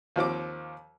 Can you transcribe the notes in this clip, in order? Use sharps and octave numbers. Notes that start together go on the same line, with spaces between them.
D#2 F3 C4 D6